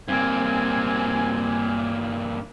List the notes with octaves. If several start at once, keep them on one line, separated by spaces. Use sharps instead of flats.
G2 A#3 C4 G#5